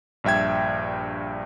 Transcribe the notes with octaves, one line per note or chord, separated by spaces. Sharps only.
A#1 G2 E5 G5 G#6